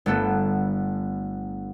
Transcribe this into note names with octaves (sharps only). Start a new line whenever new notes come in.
G1 A3 B3 A4